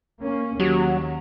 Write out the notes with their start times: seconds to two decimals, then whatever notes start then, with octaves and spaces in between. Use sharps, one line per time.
0.22 A#3 C#4
0.60 D#2 F#3 A#3 F#4 G4